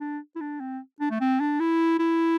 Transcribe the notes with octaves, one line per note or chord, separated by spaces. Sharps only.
D4
E4
D4
C4
D4
A3
C4
D4
E4
E4